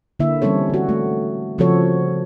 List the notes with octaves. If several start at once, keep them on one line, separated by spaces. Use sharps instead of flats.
D3 A#3 E4 E5
E3 G3 C4 C#4 A4 C#5
D3 F#4
A3
C#3 F3 C4 F#4 A4 C#5